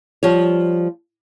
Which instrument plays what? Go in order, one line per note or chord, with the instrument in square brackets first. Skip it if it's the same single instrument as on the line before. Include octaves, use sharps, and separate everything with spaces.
[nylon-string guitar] F3 G3 C#5